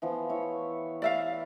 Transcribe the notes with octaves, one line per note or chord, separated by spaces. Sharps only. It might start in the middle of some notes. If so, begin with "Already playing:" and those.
E3 F3 B3
E4 C#5
D5 E5 F5